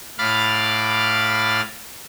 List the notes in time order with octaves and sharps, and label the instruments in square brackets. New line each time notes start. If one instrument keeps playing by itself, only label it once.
[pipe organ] A2 F5 B5 D6 F6 A6